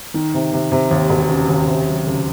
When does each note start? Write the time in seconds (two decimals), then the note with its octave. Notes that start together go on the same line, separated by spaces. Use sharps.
0.14 D#3
0.34 C3
0.53 C3
0.72 C3
0.91 D#2
1.10 E1
1.29 C#3
1.49 D#2
1.68 C3
1.87 F#3
2.07 C#2